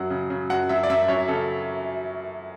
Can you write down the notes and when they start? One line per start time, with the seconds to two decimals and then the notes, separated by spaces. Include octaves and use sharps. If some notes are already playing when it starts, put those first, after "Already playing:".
Already playing: F#2 F#3 F#5
0.10 C#3
0.30 C#3
0.50 F#2 F#5
0.69 F#2 E5
0.83 D5
0.90 F#2 E5
1.08 F#2 C#5
1.28 C#3 A4